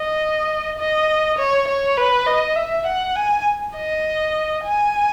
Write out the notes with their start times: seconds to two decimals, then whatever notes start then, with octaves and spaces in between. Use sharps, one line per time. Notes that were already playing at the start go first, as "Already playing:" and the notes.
Already playing: D#5
0.78 D#5
1.38 C#5
1.67 C#5
1.97 B4
2.27 D#5
2.56 E5
2.86 F#5
3.16 G#5
3.76 D#5
4.64 G#5